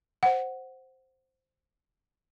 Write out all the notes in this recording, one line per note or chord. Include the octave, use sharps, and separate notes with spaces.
C5 F#5